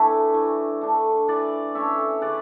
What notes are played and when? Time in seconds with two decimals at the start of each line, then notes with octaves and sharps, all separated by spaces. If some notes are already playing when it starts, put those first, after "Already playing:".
Already playing: E3 A3 D4 C#5 E5
0.34 E3
0.81 A3 D4
1.28 E3 B4 D5
1.75 A3 C#4 C#5 E5
2.21 C#3 B4 D5